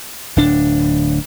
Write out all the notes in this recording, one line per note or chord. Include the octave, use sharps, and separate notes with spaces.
D1 D4